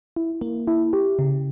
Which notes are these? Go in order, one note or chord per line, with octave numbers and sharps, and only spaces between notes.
E4
A#3
E4
G4
C#3